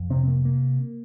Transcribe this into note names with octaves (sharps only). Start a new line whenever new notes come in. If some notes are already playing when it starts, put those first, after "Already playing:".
Already playing: F2
C3 C4
A#3
A#3